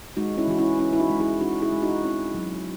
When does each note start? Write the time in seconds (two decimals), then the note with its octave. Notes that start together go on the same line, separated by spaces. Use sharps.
0.17 G#3 D#4 F#4
0.37 C#4 E4
0.47 E3 F#4
0.58 C#4 E4
0.79 C#4 E4
0.93 E4
1.00 D#4 F#4
1.10 G#3
1.20 E4 G#4
1.41 C#4 D#4 F#4
1.62 E4 G#4
1.72 G#3
1.82 D#4 F#4
2.04 C4 C#4 E4
2.34 F#3